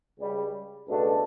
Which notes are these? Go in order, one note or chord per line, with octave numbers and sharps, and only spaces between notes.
C#2 C#3 G3
C#2 B2 A3 D4 A4